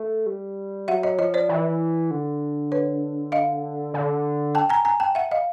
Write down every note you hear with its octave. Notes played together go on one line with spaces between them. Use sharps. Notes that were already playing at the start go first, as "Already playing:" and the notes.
Already playing: A3
G3
F#3 E5 F#5
C#5 D#5
F3 C#5 D#5
C5 D5
E3
D3
B4 C#5
D#5 F5
D3
G5 A5
G#5 A#5
G#5 A#5
G5 A5
E5 F#5
D#5 F5